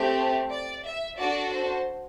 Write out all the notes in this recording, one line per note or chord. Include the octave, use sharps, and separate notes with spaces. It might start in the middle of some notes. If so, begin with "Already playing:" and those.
Already playing: A3 C4 G4
D5
E5
D4 F#4 A4 D5
C5